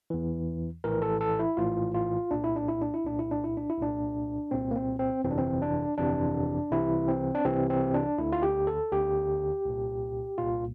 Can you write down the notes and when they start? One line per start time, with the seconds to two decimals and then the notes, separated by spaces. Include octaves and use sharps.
0.10 E2 E3
0.84 A#1 A2 E3 A#4
1.02 A4
1.21 A4
1.39 E4
1.57 A#1 A2 E3 F4
1.94 F4
2.31 C2 A#2 D4
2.44 E4
2.56 D4
2.68 E4
2.81 D4
2.94 E4
3.04 C2 A#2 D4
3.19 E4
3.31 D4
3.44 E4
3.57 D4
3.70 E4
3.78 C2 A#2 D4
4.51 C2 A#2 C4
4.71 A#3
4.76 C4
4.99 C4
5.24 G1 F2 C3 E3 C4
5.31 D4
5.38 C4
5.62 D4
5.98 G1 F2 C3 E3 D4
6.72 C2 C3 E3 E4
7.08 C4
7.35 D4
7.44 C2 C3 E3 C4
7.70 C4
7.94 D4
8.18 D2 D3 E4
8.32 F4
8.43 G4
8.67 A4
8.92 D2 D3 G4
9.65 C2 A#2
10.38 C2 A#2 F4